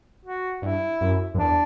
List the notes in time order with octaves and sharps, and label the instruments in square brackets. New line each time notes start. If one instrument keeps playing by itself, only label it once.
[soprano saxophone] F#4
[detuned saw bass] G2 [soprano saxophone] E4
[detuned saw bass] F#2
F#2
[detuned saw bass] E2 [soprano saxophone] D4